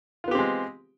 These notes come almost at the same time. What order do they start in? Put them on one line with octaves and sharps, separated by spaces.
F4 B3 G4 C4 G#3